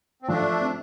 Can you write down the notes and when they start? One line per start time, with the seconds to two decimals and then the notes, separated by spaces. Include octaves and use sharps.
0.22 C4
0.28 F3 A3 D4
0.61 C4